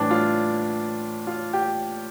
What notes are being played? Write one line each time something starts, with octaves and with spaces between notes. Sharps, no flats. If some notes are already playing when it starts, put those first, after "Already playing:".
Already playing: A2 E3 G3 D4
F4
F4
G4